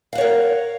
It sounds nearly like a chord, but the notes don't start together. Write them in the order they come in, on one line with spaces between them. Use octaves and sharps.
F5 F#5 C#5 A#4